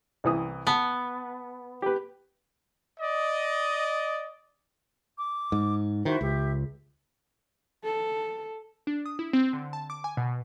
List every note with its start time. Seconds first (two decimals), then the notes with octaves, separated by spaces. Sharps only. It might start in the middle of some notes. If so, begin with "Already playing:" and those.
0.24 C2 E3 D#6
0.67 B3 A5
1.82 G4 B4
2.99 D5 D#5
5.17 D6
5.52 G#2
6.05 D#3 E4 F#4 C5
6.21 C#2 G4 E5
7.84 A4
8.87 D4
9.06 D#6
9.19 E4
9.33 C4
9.53 D3
9.73 A5
9.90 D6
10.04 G#5
10.17 B2